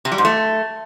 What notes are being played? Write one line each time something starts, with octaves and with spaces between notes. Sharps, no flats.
C3
G3
G#2
A3